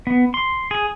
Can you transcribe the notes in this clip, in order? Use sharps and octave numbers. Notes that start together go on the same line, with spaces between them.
B3
C6
G#4